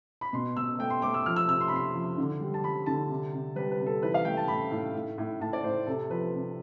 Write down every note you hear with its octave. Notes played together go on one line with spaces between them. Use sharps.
B5
B2 C6
B2 E6
A3 G5
C6
A3 D6
E6
F3 F6
E6
C3 E6
C6
B5
C3 C6
F3
D3
G3
A5
G3 B5
D3 A5
C3
C3
G3 B4
B4
C3
A4
E3 B4
F5
A3 G5
A5
A2 B5
A2
A2
A2
A2 A5
D5
A2 C5
C3 A4
F3 B4
C3